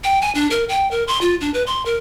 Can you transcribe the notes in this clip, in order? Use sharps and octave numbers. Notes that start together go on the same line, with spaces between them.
G5
G#5
D4
A#4
G5
A#4
C6
F4
D4
B4
C6
A#4